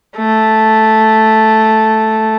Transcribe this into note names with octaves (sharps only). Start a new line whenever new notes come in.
A3